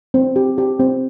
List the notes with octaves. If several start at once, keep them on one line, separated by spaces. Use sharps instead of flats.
C4
G4
G4
C4